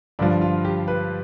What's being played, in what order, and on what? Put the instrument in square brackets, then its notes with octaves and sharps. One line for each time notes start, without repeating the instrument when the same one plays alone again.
[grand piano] G2 D3 F3 D4
F4
G4
B4